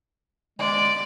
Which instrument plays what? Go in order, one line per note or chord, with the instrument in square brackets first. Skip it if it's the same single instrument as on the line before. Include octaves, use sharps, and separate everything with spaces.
[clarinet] G#3 [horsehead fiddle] D5